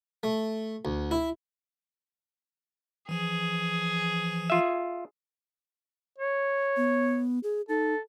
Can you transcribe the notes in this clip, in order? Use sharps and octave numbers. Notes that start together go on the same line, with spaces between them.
A3
D2
E4
E3 F3 G#4
F4 E5
C#5
B3
G#4
D#4 A4